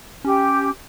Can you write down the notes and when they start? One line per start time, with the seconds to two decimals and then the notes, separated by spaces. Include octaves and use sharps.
0.25 C#4 G4